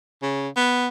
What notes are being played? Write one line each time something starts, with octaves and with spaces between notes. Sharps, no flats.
C#3
B3